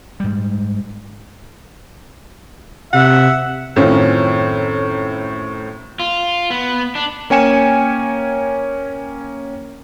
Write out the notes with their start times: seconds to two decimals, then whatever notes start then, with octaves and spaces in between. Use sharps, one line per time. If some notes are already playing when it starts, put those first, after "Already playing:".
0.20 G#2 G3
2.93 C3 E5 F#5
3.76 F#2 A2 D#3 C4 C#4 F4
6.00 F4
6.50 B3
6.95 D4
7.30 A#3 C#4 G5 G#5 C#7 E7